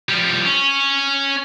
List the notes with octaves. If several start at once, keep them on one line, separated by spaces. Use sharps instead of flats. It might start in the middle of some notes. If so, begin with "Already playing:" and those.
F3 G3
C#4